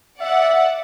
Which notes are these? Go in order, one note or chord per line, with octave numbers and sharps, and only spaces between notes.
D5 E5 F#5